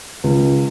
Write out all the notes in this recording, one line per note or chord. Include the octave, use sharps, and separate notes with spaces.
C#2